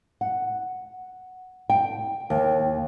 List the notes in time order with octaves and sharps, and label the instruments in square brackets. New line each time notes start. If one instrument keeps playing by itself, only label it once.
[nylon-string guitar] F#5
G5
D#2